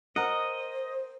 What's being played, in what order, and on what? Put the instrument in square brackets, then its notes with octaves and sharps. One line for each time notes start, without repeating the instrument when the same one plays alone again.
[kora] A#4 F#5 [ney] C5 [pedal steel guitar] D#5